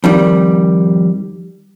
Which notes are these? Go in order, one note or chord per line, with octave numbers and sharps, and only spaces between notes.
F2 D#3 G3